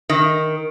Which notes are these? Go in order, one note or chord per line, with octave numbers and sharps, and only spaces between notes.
D#3